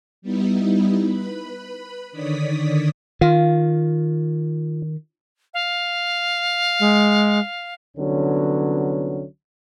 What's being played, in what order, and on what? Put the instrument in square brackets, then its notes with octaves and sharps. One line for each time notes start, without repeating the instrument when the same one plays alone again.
[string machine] G3 B3 D#4 E4
B4 B5
D3 D#3 C#5 D5 D#6 B6
[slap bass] D#3 [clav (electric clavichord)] F4
[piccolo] F5
[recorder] G#3
[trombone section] C2 D3 F#3 B3 C#4